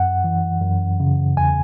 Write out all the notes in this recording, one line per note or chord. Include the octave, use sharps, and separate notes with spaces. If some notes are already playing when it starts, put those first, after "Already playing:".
Already playing: F#2 F#5
E3
F#2
C#3
E2 G#5